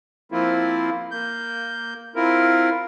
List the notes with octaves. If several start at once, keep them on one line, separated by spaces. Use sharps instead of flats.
F3 A#3 C4 E4 F4
A#3 G6
C4 E4 F4 A#4